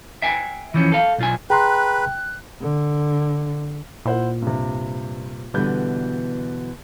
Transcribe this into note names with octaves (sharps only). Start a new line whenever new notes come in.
E5 G5 G#5
E3 F3 C#4
A4 F5
B1 F4 G#5
G#4 B4 G5 A#5 C6 F#6
D3
A#2 E4 C5 F#5
G2 C3
B2 D3 E3 G3 B4 G6